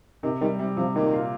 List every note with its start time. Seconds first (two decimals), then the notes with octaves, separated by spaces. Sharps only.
0.23 C3 D#3
0.41 D#3 G3
0.59 C3 G3
0.77 C3 F3
0.96 A#2 D#3
1.13 F4